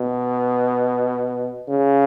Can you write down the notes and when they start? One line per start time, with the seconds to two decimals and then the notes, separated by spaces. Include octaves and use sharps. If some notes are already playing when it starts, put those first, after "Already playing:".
Already playing: B2
1.69 C#3